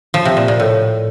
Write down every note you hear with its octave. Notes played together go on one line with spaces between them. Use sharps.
F3
C3
A#2
A#2
A2